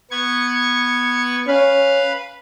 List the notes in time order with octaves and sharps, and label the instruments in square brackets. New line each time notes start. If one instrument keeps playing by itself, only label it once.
[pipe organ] B3 C#6 G#6
[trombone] C#4 [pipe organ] B4 F5